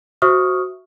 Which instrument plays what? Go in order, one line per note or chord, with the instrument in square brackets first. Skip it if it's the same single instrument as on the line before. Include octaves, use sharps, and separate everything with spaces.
[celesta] F#4 C5 E5 C#6 D#6 F6